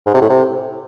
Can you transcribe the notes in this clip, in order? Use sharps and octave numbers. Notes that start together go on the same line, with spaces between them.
G#2
C3
A2
C3